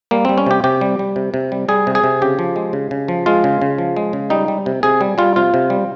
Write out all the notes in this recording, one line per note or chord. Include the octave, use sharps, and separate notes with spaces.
G3 A#3
G3 C4
C#4
C3 G4
C3 G4
G3
G3
C3
C3
G3
G3 G#4
C3
G#4
C3
C#3 G4
F3
G#3
C#3
C#3
F3
G#3 F4
C#3
C#3
F3
G#3
C#3
G3 D#4
G3
C3
C3 G#4
G3
G3 F4
C3 F4
C3
G3